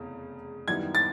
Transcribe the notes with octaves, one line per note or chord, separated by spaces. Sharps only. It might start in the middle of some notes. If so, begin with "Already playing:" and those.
Already playing: F1 E2 C#3
F#2 D#3 G3 B3 E4 G#6
A6